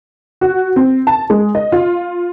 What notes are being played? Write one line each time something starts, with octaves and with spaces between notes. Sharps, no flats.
F#4
C4
A5
G#3
D#5
F4